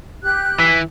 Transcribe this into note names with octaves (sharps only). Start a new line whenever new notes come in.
G4 F#6
E3 B6